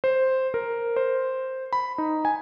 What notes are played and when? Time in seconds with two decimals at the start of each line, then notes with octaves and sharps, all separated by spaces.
0.04 C5
0.54 A#4
0.96 C5
1.73 B5
1.98 D#4
2.25 G#5